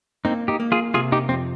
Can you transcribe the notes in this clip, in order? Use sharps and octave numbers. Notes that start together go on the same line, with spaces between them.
A#3 C4 D#4
D#4 G4
A#3
F4 G#4
C3 F4 G#4
D#4 G4
F2 C4